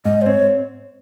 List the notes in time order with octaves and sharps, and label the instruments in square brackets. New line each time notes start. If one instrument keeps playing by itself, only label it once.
[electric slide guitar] G#2 [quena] D#5
[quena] C5
[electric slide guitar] C4 [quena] C#5